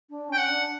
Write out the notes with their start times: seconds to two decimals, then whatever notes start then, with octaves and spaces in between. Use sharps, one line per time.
0.10 D4
0.29 C#4 G5
0.39 F#5
0.49 D4